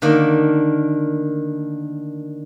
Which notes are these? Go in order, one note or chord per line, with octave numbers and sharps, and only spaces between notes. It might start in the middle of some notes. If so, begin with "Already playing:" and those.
D3 D#3 A3 A#3